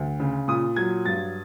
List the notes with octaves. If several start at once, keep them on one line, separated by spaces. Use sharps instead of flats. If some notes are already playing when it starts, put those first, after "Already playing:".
Already playing: D2
C#3
A#2 D#6
F#3 G#6
G2 A6